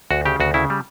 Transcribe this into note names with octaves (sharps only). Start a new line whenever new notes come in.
D2 F#4
C#3 G4
D2 F#4
C#3 E4
G3